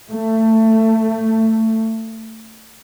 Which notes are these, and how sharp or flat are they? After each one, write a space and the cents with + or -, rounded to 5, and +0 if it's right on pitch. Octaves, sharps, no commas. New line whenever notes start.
A3 +20